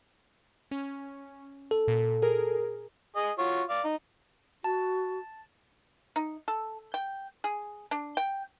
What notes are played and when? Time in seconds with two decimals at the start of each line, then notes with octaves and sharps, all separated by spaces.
0.71 C#4
1.71 A4
1.88 A#2
2.22 G#4 A#4
3.16 G#4 D#5
3.39 F4 F#4 C#5
3.69 D5 F5
3.85 D#4
4.64 F#4 A5
6.16 D#4
6.48 A4
6.94 G5
7.44 G#4
7.91 D4
8.17 G5